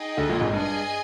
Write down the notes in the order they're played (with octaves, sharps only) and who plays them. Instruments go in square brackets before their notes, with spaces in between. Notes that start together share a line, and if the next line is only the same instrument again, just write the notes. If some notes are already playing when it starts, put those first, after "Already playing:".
Already playing: [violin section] D#4 G#4 D#5 G5
[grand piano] D2 D3
A#1 A#2
G#1 G#2
[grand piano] G2 [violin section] G#4 D#5 G#5